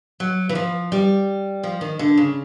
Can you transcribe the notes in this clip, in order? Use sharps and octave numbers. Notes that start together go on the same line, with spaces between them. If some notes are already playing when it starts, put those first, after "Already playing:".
F#3
E3
F3
G3
F3
D#3
D3
C#3